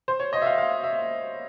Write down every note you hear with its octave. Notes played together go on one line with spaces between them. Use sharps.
C5
C#5
D#5
E5
F5
F5
E5